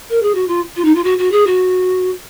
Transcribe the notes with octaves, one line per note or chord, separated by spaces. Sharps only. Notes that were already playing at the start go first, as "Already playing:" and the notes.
A#4
G#4
F#4
F4
F4
D#4
F4
F#4
F#4
G#4
F#4